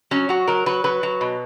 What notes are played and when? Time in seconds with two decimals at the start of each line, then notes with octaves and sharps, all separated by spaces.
0.11 F#3 C#4
0.29 F#3 F#4
0.48 F#3 A#4
0.66 F#3 B4
0.84 F#3 B4
1.03 F#3
1.21 B2